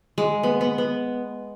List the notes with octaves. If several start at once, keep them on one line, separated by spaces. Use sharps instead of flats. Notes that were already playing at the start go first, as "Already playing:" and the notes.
G#3
B3
B3
B3